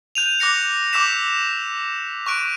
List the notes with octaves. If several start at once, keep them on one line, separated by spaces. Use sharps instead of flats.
F#6 G6 D#7 F7
D6 F#6 A#6 C#7
D6 E6 G6 B6 E7
C#6 F#6 D7